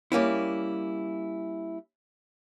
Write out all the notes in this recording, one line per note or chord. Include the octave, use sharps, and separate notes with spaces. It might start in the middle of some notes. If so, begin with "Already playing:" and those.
G3 A#3 C#4 E4